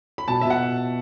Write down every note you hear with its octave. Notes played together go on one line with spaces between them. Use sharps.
B5
B2 A5
B2 E5
F#5